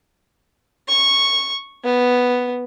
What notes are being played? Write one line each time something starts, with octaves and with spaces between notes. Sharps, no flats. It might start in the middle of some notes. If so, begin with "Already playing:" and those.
C#6
B3